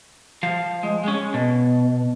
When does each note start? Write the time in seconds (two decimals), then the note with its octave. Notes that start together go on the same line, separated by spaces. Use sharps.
0.43 F3 F5
0.83 G#3
1.04 G#3 C#4
1.34 B2